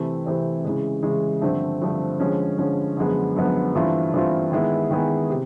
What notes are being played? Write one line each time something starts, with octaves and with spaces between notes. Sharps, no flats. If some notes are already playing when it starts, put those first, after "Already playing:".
Already playing: C3 E3 A3 C4
C3 E3 A3 C4
C#3 E3 G#3
C#3 E3 G#3
G2 D3 F3 A3 C4
G2 D3 F3 A3 C4
D3 F3 G#3 C#4
D3 F3 G#3 C#4
F#2 D3 F3 G#3 B3
F#2 D3 F3 G#3 B3
G2 E3 A3 C4 F4
G2 E3 A3 C4 F4
D#3 G#3 B3 E4 G#4
D#3 G#3 B3 E4 G#4
C3